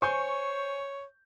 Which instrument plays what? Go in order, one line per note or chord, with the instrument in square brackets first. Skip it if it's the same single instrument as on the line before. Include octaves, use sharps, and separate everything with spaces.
[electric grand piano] C5 G#5 G6 [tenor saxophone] C#5 [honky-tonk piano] C#6